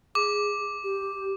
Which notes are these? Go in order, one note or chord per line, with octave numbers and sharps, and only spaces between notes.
G#4 D6
G4